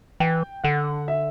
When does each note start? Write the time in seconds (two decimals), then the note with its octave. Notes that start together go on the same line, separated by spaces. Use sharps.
0.20 E3 G5
0.64 D3 F#5
1.08 E5